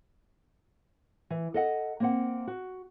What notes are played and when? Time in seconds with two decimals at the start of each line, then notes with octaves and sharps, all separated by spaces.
1.30 E3
1.54 A4 D#5 F#5
2.00 A#3 C4 F#5
2.47 F#4